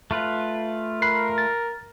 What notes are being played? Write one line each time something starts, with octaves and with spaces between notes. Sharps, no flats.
A3 F4 B4
A#4 B5 F#6 C7
A6